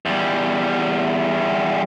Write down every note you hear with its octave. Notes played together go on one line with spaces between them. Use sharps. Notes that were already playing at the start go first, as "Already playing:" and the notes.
E2 G3